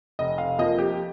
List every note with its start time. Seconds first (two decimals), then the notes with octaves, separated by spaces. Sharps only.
0.19 F1 D#5
0.38 F5
0.58 F2 F3 A#3 D#5
0.79 G4